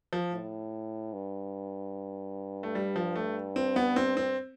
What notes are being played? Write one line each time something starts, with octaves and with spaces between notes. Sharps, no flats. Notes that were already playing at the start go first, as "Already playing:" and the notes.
F3
A2
G2
A3
G3
F3
A3
C4
B3
C4
C4